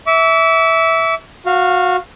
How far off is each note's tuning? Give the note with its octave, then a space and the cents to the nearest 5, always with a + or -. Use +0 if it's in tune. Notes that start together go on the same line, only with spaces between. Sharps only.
E5 -15 D6 -45
F#4 -20 F5 +0